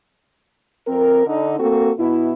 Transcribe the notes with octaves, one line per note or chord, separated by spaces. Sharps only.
F2 C4 A#4
D3 D#4
A#3 C4 F#4 A4
B2 E4